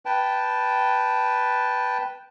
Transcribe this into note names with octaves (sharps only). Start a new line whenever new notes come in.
B4 G5 A5